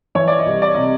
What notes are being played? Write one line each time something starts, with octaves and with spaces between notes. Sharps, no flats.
E3 C#5
D5
D#5
C2
D5
C3 D#5